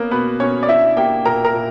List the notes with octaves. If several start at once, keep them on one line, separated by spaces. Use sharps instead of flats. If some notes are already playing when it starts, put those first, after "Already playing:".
Already playing: A#3 B3 C#4 A#4
B2 B3 B4
B2 C#4 C#5
D5
D4 E4 E5
A#3 G4 G5
A#2 A#4 A#5
A#4 A#5
A#2